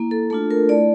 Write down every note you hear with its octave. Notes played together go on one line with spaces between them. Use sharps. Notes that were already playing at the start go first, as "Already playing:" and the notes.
Already playing: A#3 E4
A4
A3 D4 F4 A4
A#4
A3 E4 D5